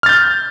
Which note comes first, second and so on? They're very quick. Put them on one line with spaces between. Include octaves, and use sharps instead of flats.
F6 A6 G6